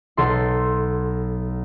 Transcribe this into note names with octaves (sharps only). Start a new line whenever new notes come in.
B1 A4 C6